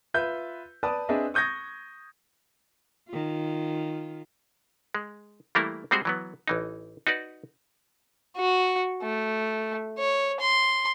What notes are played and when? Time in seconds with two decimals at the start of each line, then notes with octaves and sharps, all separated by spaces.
0.14 F4 B4 E5 G6
0.83 B4 D5 A5 D#6
1.09 C4 D4 G#4 B4 D#5 E5
1.34 C#6 D#6 G6 G#6 A#6
3.09 D#3 F4
4.95 G#3
5.55 E3 G3 A3 A#3 E4 A#4
5.91 G3 G#3 C4 F#4 G#4 C5
6.05 E3 F#3 B3
6.48 A1 E3 D#4
7.07 D#4 F#4 B4 D5
8.37 F#4
9.02 A3
9.98 C#5
10.40 C6